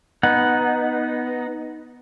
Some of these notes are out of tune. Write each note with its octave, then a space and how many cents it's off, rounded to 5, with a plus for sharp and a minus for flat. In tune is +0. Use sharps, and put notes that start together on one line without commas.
B3 +0 D#4 +0 F#5 +0